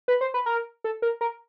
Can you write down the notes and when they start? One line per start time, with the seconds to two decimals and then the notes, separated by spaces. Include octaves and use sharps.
0.08 B4
0.21 C5
0.34 B4
0.46 A#4
0.84 A4
1.02 A#4
1.21 A#4